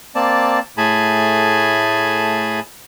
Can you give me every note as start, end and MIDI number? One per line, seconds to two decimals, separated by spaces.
0.15 0.60 58
0.15 0.60 60
0.15 0.60 74
0.15 0.60 81
0.77 2.60 45
0.77 2.60 57
0.77 2.60 68
0.77 2.60 80
0.77 2.60 81
0.77 2.60 83